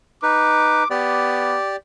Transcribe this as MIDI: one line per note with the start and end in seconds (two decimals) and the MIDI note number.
0.23 0.84 63
0.23 0.84 71
0.23 0.87 86
0.90 1.58 59
0.90 1.76 67
0.90 1.76 74